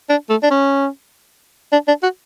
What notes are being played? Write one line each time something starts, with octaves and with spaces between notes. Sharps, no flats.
D4
A3
D4
C#4
D4
D4
F#4